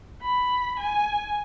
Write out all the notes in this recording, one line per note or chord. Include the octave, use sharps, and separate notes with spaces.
B5
G#5